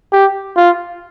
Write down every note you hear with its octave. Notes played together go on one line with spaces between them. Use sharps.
G4
F4